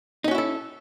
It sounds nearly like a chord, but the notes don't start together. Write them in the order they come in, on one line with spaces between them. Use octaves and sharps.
D#4 C#4 F#4 E4 A4